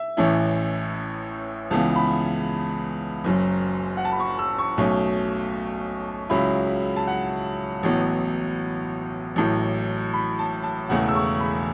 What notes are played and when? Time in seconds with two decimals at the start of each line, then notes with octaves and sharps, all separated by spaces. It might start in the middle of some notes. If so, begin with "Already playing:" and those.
Already playing: E5
0.17 A1 A2 E3 C#4 E4
1.71 C#2 C#3 E3 B3 A5
1.96 B5
3.24 F#1 F#2 F#3
3.97 F#5
4.05 A5
4.12 B5
4.20 C#6
4.39 E6
4.58 C#6
4.78 B1 B2 A3 C#4
6.30 C#2 C#3 F#3 C#4 E4 B5
6.96 A5
7.07 F#5
7.83 A1 A2 F#3 B3
9.36 A1 A2 F#3
10.14 B5
10.39 A5
10.63 A5
10.89 E1 E2 C#3 A3 F#5
11.08 E6
11.15 C#6
11.40 B5